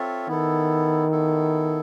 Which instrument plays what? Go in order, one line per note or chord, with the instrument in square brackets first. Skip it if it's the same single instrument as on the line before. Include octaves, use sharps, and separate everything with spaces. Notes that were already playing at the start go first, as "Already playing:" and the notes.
Already playing: [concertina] C4 F4 A4 C#5 E5
[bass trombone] D#3 [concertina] B3 E4 A4
[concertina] B3 E4 A4